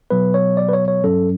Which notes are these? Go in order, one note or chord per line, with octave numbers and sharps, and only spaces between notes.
B2 F#3 B3 B4
C#5
D5
B4
C#5
C#5
G2 F#3 C#4 A4